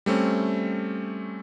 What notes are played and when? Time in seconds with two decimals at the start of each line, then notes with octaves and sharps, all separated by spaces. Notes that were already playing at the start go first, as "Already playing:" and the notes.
0.06 G3 A3 C4 C#4